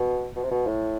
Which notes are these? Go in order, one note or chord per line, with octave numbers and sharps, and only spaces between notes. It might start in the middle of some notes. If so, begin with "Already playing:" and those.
Already playing: B2
B2
C3
B2
A2